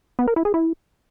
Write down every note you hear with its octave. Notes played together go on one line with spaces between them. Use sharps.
B3
A#4
E4
G#4
E4